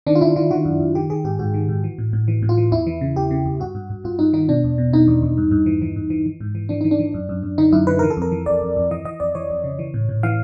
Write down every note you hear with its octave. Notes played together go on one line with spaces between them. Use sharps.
D#3 D4
F4
D#3 E4
D#3 F4
D#3 F#4
F#2
F#2
D#3 G4
D#3 G#4
G#2 G4
G#2 F#4
D#3
G#2
E3
A2
A2
E3
A2
F4
E3
E2 E4
E3
C#3
E2 G4
C#3
E2
G2 F#4
G2
G2
G2 F4
G2 D#4
D#3 D#4
B2 D4
E2
B2
B2 D#4
E2
E2
G2
G2
E3
E3
G2
E3
E3
G#2
E3
E3 D4
E3 D#4
D4
E3
F#2
F#2
F#2
D3 D#4
F#2 E4
D3 B4
E3 A#4
A4
F2 A#4
E3
F2 D5
F2
F2
E3 D#5
E3 D#5
F2 D5
E3 C#5
F2
C#3
E3
A2
A2
E3 F5